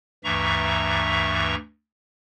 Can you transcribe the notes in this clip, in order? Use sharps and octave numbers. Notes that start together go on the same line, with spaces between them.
D2 G2 E3 E5 A#5 C#6